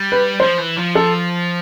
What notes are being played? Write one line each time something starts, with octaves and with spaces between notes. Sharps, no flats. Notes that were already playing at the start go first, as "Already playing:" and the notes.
Already playing: G3
B4
F3 C5
E3
F3
A4